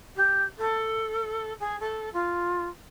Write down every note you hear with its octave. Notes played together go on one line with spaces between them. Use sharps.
G4
A4
G#4
A4
F4